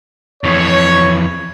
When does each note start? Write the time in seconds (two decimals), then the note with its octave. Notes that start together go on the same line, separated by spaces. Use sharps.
0.44 F2 E3 C#5